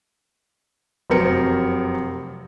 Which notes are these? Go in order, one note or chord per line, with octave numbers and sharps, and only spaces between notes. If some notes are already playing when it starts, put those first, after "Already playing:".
F1 F#2 C4 A#4 C#7